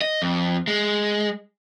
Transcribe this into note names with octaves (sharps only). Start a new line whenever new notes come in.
D#5
F2
G#3